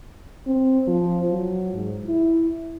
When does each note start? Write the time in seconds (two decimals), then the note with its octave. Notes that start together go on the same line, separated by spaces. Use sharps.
0.47 C4
0.88 F3
1.30 F#3
1.74 G#2
2.07 E4